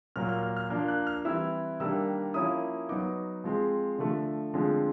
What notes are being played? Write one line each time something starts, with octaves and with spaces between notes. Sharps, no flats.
A#2 F#3 A#3 F6
F6
F6
F6
F3 A#3 D4 F6
F#6
F6
E3 G3 C4 E4 E6
D#3 G3 A#3 D4 E6
F3 A#3 C#4 E4 D#6
F#3 B3 D#4 D6
F3 G#3 C4
D3 F3 A3
D3 F3 G#3 C4